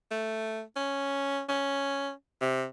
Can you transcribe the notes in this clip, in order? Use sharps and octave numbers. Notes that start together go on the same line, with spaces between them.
A3
C#4
C#4
C3